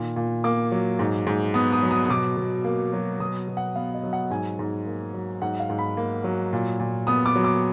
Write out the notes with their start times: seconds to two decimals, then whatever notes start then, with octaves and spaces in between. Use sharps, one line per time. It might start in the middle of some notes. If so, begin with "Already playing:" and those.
Already playing: A#2 D#3
0.16 A#2
0.44 A#3 D6
0.72 F#3
0.99 G#2
1.27 G#2
1.54 B3 D#6
1.73 D#6
1.83 F#3
1.91 D#6
2.05 D#6
2.09 B2 D6
2.37 B2
2.64 A#3
2.93 F#3
3.20 B2 D#6
3.48 B2
3.57 F#5
3.76 B3 F5
3.94 D#5
4.03 F#3
4.13 F#5
4.30 G#2 G#5
4.59 G#2
4.86 A#3
5.14 F#3
5.42 G#2 F#5
5.60 F5
5.70 G#2
5.79 B5
5.97 A#3
6.24 F#3
6.53 A#2
6.80 A#2
7.07 B3 D#6
7.26 D6
7.36 F#3
7.44 D6